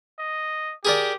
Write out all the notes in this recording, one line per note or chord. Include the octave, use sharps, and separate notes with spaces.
D#5
G4 G#4 A#4 D5